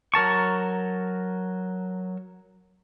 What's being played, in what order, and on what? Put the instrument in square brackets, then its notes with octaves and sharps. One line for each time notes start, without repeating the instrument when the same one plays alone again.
[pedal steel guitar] F#3 A#4 A5 C#6